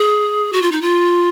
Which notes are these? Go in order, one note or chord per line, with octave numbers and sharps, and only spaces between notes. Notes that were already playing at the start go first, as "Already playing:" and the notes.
Already playing: G#4
F#4
F4
D#4
F4